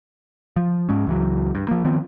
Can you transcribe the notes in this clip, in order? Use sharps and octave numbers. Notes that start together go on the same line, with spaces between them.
F3
G#2 G#3 C#4
C#2 E3 F#3
G2
F3 A#3
D#3 F3 B3 C4